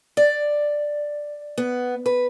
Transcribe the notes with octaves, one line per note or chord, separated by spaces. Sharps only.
D5
B3
B4